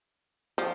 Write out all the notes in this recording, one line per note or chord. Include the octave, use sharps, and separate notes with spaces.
F3